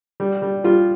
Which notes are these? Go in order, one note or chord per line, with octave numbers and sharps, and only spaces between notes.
G3
G3
F3 G3 F4